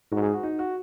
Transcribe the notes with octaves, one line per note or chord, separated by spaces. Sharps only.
G#2 F#4
G#4
F#4
D#4
F#4